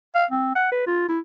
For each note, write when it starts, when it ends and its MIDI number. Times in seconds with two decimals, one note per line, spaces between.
0.15 0.25 77
0.31 0.52 60
0.55 0.71 78
0.72 0.85 71
0.87 1.06 65
1.09 1.19 64